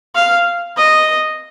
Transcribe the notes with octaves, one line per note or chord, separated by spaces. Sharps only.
F5
D#5